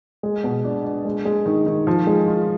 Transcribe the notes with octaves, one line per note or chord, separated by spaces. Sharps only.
G#3
B2
D4
D4
G#3
G#3
D#3
D#3
F3
G#3
F4